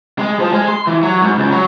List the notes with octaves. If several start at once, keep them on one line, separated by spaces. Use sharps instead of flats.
G#3
F3
G#3
C6
E3
F#3
G#2
C#2
F#3